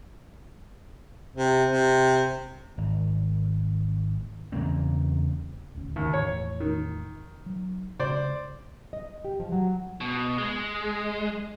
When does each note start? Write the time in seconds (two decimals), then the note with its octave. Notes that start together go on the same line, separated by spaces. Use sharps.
1.36 C3
1.71 C3
2.78 G#1
4.52 E2 C#3 A#3 C4
5.75 D#1 D2 C#4
5.96 G1 D#2 C#3
6.14 E2 A2 E3 C#5
6.60 D#3
7.46 F#3
7.99 C#3 G#3 C4 C5 D5
8.93 D#5
9.25 G4
9.40 F3
9.52 F#3
10.01 B2
10.38 G#3